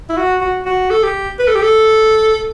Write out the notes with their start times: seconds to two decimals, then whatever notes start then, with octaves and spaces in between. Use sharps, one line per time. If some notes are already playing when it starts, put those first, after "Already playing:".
0.09 E4
0.17 F#4
0.41 F#4
0.65 F#4
0.90 A4
1.03 G4
1.39 B4
1.47 A4
1.55 G4
1.62 A4